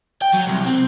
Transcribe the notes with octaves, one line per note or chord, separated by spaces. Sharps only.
G5
F#3
C2
C4